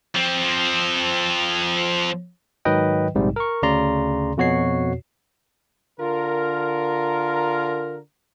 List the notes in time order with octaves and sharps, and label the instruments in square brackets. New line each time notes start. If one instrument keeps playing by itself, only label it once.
[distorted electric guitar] F3 C4
[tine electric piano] G#2 D#3 F#3 B4 D#5 G5
A#1 G#2 C3 G3
A#4 C#6
D2 C#3 D5 A#5 C6
F2 B2 F#4 C#5 C7
[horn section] D3 F4 A#4